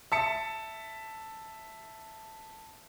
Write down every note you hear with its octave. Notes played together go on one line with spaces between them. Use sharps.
E5 A5 C#7